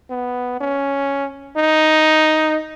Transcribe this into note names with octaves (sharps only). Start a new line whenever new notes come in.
B3
C#4
D#4